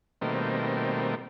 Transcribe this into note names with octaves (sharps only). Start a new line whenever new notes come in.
B2 D#3 G3 A3 A#3 C4